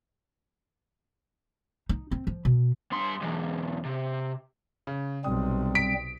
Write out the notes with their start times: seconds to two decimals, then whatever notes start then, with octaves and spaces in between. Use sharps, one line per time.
1.89 D#4
2.11 C4
2.27 F3
2.45 B2
2.92 G2 C6
3.22 B1 E2
3.85 C3
4.87 C#3
5.24 B1 C3 G3 C4 D#6
5.75 B6 D7